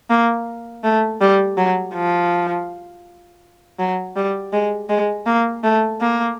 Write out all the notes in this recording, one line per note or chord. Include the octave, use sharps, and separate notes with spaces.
A#3
A3
G3
F#3
F3
F#3
G3
G#3
G#3
A#3
A3
A#3